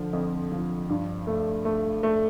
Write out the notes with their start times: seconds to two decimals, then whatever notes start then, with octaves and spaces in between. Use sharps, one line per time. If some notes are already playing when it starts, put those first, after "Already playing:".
Already playing: D3 F3
0.13 F2
0.52 F3
0.89 G2
1.27 A3
1.65 A3
2.03 A3